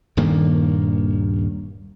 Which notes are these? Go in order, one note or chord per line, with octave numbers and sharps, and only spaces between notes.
D#1 G2 D#3 A#3